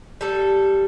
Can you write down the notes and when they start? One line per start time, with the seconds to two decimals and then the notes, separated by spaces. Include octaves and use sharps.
0.21 G3 A4